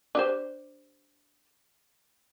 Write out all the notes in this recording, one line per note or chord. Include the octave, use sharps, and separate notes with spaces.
D4 G4 C5